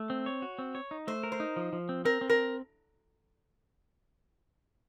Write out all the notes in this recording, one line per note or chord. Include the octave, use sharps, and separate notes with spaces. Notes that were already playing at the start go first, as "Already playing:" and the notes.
Already playing: A3
C4
C#5
F#4
C4
C#5
D#4
A3 C5
A#4
C5
D#4
F3
F3
C4
C4 A#4
C4
A#4